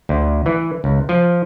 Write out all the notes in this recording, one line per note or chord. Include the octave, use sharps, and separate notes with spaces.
D2
E3
C#2
F3